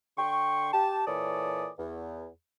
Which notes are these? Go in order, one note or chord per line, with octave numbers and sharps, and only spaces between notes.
D3 G5 C6 C#6
G4 A5
A#2 E3 A4 C#5 D5 D#6
E2